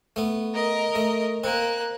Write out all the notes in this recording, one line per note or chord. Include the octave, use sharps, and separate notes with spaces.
A3 B3
A#4 D#5
A3
A#3 C4 F#6